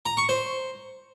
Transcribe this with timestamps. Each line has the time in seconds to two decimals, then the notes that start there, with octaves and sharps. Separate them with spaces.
0.06 A#5
0.17 C#6
0.29 C5